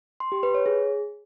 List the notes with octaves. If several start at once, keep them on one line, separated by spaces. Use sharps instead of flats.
C6
G4
B4
C#5
G#4